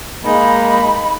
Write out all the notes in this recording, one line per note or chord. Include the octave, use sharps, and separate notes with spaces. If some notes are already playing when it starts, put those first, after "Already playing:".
G#3 A#3 D#4 B5